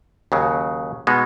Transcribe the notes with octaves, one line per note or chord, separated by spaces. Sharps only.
D#2 C#3 F#3
B2 G#3 B3 D#4